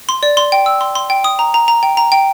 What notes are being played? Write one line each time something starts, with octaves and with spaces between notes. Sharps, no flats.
C6
D5
C6
G5
E6
C6
C6
G5
D#6
A#5
A#5
A#5
G5
A#5
G5